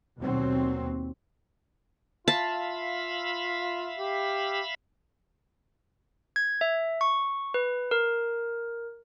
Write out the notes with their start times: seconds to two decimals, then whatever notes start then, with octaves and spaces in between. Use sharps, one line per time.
0.18 D#2 B2 F#3 C4
2.28 F4 E5 F5 A5 B5
3.99 G4
6.36 G#6
6.61 E5
7.01 C#6
7.54 B4
7.91 A#4